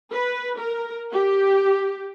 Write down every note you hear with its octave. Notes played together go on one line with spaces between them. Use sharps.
B4
A#4
G4